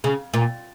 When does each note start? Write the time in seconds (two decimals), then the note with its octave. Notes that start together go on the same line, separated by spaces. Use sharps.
0.04 C#3
0.34 A#2